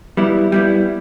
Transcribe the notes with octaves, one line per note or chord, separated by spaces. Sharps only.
G3 B3 E4
G3 B3 E4